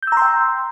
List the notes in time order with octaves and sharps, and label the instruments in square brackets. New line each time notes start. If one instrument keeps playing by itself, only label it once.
[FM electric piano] G6
E6
A#5
C6
G5